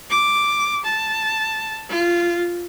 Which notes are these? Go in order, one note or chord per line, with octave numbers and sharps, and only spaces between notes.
D6
A5
F4